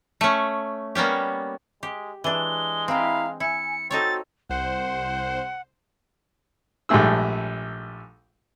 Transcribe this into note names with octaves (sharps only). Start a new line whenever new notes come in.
A3 C#4
G3 A#3 B3 C#4 G4
G#3 G4
E3 G#3 D4 G7
C4 E4 F5 G5 A#5 B5
E4 G#5 C#7
C4 D#4 F#4 A4 C#5 A6
C2 C5 F#5
A#1 G#2 G3 A3 G#4 E6